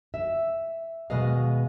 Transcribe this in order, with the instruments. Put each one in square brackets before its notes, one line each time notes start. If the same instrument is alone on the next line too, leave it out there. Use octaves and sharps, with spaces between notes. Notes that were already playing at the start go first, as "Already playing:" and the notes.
[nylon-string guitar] E5
D#2 B2 G#3 B4 D#5 F5